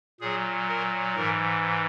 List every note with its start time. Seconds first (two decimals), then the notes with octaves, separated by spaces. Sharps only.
0.20 A#2 F#3 G#4
0.68 A#4
1.15 G#2 E3 A#4